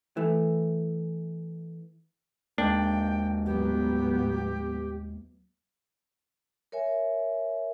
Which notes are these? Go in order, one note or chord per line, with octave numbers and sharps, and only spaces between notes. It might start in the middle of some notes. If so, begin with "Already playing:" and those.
E3 A3
D#2 G#3 A#3 D4 G5
A2 F#3 B3 G4
A#4 C#5 E5 G#5